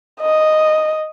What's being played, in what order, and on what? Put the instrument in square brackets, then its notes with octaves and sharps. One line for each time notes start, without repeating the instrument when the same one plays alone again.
[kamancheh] D#5